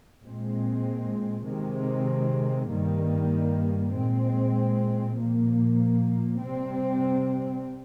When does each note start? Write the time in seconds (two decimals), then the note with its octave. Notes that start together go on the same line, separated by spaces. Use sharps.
0.22 A#2 G#3 C4
1.46 C3 D#3 G#3 C4
2.70 G2 D#3 G3 A#3
3.94 A#2 G#3 C4
5.18 A#2 F3 A#3
6.41 C3 G3 C4